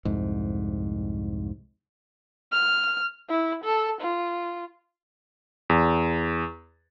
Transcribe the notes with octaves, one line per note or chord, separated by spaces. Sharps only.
C2 F2 G#2
F6
E4
A4
F4
E2